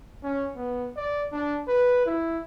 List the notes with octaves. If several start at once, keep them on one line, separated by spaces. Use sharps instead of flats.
C#4
B3
D5
D4
B4
E4